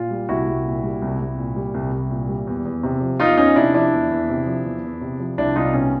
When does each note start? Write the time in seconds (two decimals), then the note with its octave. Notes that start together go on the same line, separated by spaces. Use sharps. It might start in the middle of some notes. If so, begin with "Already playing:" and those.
Already playing: A#2 F4
0.11 G3
0.29 C2 E4 F#4
0.47 C2
0.65 A#2
0.83 G3
1.02 C2
1.20 C2
1.38 A#2
1.56 G3
1.74 C2
1.93 C2
2.10 A#2
2.29 G3
2.47 E2
2.65 E2
2.83 C3
3.01 F3
3.19 E2 D#4 F4
3.37 E2 C#4 D#4
3.56 C3 D4 E4
3.74 F3 D4 E4
3.93 E2
4.11 E2
4.29 C3
4.46 F3
4.65 E2
4.84 E2
5.01 C3
5.20 F3
5.38 C2 D4 E4
5.56 C2 D#4 F4
5.74 B2 C#4